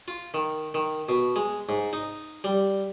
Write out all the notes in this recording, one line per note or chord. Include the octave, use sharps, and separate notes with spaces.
F4
D#3
D#3
B2
G#3
G#2
D#4
G3